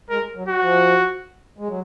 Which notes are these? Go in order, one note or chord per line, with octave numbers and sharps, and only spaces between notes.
G#3 A#4
F#3
F#4
F3
G#3
F#3